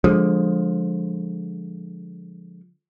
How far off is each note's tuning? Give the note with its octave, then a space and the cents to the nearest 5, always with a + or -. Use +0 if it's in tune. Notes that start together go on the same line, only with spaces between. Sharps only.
D3 +0 F3 +20 G#3 +0